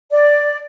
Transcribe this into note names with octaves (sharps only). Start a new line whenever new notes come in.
D5